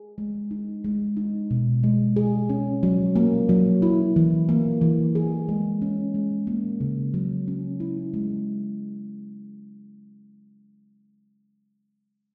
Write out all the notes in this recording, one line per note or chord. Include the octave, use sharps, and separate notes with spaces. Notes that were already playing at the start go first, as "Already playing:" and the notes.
Already playing: G#4
G#3
D#4
G#3
D#4
B2
G#3
G#4
C#4
F#3
A#3
F#3
E4
E3
A#3
E3
G#4
G#3
C#4
G#3
A#3
C#3
F#3
C#4
E4
G#3